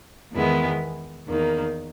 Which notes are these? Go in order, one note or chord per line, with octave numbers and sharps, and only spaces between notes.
E2 D#3 G#3 B3 E4
E2 D#3 A#3